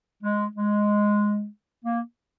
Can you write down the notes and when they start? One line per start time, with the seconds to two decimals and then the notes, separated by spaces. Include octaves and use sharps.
0.23 G#3
0.56 G#3
1.85 A#3